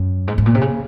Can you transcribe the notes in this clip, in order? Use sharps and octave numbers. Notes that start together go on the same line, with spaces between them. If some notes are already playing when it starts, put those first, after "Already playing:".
Already playing: F#2
G#2
G#2
A#2
C3
C#3